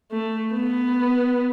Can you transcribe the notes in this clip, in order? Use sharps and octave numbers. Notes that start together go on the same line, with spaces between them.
A3
B3